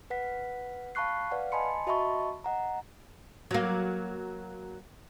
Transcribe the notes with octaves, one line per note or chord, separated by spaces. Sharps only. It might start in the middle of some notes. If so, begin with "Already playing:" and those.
B4 F#5 B6
F5 A5 B5 C#6 F#6 C7
B4 D5 F5 F#5
D#5 G#5 A5 B5 C6 C#7
F#4 D#5 E5 A5 B5 C#6
D#5 F#5 A#5
F#3 A#3